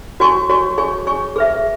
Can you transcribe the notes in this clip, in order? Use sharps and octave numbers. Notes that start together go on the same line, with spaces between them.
F#4 C#5 G#5 C#6
F#4 C#5 G#5 C#6
G#4 C#5 G#5 C#6
G#4 C#5 G#5 C#6
G#4 B4 E5